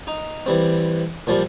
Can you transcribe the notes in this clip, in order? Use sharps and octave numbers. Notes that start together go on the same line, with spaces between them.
D#4
E3 G3 C4
A#2 F3 G3